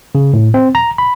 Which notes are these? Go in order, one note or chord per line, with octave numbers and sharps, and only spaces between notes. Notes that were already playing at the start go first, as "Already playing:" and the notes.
C#3
A2
C4
A#5
B5